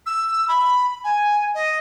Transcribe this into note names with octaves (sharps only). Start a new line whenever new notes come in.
E6
B5
G#5
D#5